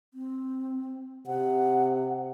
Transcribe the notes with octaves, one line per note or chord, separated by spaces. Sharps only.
C4
C3 F#5